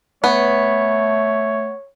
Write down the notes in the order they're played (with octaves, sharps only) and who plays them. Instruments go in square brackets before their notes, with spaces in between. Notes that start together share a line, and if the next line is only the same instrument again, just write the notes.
[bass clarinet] A3 [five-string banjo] B3 [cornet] C#5